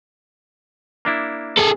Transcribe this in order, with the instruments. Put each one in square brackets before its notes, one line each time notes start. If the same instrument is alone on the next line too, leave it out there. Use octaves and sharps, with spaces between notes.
[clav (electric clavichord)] A#3 D4 E4
[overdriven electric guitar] G#4 A4